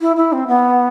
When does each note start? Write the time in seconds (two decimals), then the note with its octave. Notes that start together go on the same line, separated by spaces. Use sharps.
0.01 E4
0.16 E4
0.32 C4
0.47 B3